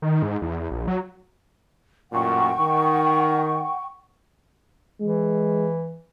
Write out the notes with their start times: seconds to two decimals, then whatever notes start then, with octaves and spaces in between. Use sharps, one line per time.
0.02 D#3
0.23 G#2
0.42 E2
0.71 A#1
0.88 F#3
2.12 A1 F#2 A#2 F#5 G5 C#6
2.59 D#3
5.01 E3 G#3